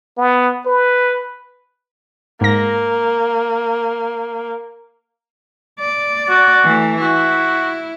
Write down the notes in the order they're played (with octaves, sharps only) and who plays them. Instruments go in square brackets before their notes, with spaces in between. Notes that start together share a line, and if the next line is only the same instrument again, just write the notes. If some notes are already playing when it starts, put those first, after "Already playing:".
[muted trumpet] B3
B4
[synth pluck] G#2 A#6 [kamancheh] A#3
[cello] D5
[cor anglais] F#4
[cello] E3 A3
[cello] E4 [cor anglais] F#4